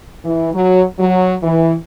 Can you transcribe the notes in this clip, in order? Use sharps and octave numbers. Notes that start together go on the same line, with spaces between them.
E3
F#3
F#3
E3